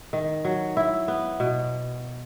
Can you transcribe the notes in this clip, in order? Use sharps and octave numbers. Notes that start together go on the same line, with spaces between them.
D#3
F#3
E4
B3
B2